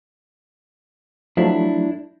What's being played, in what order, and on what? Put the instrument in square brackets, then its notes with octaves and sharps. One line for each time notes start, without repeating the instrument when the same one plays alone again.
[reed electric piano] F3 F#3 A3 [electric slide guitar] D4 E4